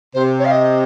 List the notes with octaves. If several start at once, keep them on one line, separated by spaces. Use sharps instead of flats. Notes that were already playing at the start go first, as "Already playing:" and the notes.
C3 C5
C#5
F5
D#5